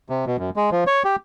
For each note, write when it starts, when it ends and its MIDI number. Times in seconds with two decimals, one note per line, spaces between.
0.10 0.25 48
0.27 0.37 47
0.39 0.50 42
0.56 0.70 56
0.71 0.84 53
0.87 1.03 73
1.05 1.16 67